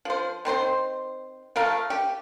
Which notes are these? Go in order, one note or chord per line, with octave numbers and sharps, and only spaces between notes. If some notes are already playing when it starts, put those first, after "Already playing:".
F3 C5
D#3 C4 C5 C6
F3 A3 A#4 F5
G4